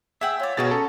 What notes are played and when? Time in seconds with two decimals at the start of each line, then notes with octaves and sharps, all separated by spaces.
0.21 G#4 E5 F#5 G5 E6
0.40 F4 C#5 D5
0.57 B2 F#4 G#4 A#5 B5 A6
0.71 C#4 A4